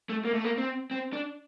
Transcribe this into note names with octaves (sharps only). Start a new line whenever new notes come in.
A3
A#3
A3
A#3
C4
C4
D4